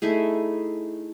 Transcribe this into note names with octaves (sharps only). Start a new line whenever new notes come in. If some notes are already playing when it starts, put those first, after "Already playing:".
A3 D#4 E4 G#4